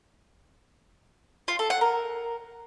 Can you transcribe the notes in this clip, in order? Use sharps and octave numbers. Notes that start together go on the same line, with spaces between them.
F4
A4
F#5
A#4